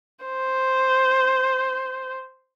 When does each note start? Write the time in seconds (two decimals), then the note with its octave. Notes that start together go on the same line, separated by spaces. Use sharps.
0.25 C5